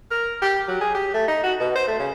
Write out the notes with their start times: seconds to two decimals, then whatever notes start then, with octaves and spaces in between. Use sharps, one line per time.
0.11 A#4
0.42 G4
0.68 F#3
0.81 G#4
0.94 G4
1.14 A3
1.28 D#4
1.43 F#4
1.60 B2
1.76 C5
1.87 A3
1.99 C#3